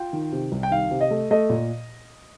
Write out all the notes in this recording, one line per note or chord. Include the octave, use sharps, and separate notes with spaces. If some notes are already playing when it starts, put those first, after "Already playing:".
Already playing: F4 G5
D#3
C3
C2
G5
D#3 F5
C3
D#5
A3
A3 D#5
A#2